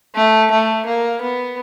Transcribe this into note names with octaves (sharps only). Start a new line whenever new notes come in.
A3
A3
A#3
B3